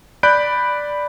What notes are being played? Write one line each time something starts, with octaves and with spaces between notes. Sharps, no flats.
D5 B5 F#6 G6 D7